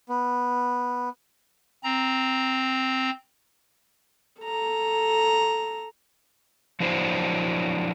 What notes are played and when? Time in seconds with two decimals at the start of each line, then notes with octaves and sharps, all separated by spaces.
0.09 B3
1.83 C4 A#5
4.42 A4 A#5
6.80 F3 F#3 D4 E4 C5